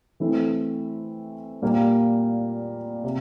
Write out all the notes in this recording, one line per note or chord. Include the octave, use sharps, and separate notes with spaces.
E3 A3 C4 E4
A#2 G3 A#3
C3